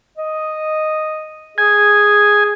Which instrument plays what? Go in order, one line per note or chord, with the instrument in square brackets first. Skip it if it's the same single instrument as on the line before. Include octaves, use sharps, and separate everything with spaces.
[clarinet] D#5
[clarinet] G#4 [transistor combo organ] G#5